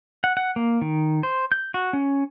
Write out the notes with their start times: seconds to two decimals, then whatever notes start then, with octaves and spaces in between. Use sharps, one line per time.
0.24 F#5
0.37 F#5
0.56 A#3
0.82 D#3
1.23 C5
1.52 G6
1.74 F#4
1.93 C#4